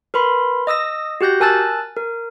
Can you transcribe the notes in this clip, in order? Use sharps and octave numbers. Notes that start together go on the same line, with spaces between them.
A#4 B4 B5 C6
D#5 D#6 E6 A#6
F#4 G4 F#6 G6 A#6
A#4 G#5 A5 E6 F#6 A6
A#4